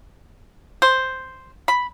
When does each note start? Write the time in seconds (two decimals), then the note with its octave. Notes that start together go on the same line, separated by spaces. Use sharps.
0.82 C5
1.68 B5